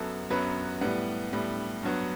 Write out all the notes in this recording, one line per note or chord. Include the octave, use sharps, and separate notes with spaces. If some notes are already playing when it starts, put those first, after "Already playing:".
Already playing: F#2 F#3 B3 A4 A5
F#2 F#3 B3 B4 B5
A2 G3 B3
A2 G3 B3
G2 F#3 B3